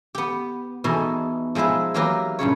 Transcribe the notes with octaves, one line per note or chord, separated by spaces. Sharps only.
B3 G4
B2 E3 D#4 G#4 A4
F3 G#3 D#4 E4 B4
E3 F#3 A#3 G4 A#4 B4
G2 A#2 C#3 C#5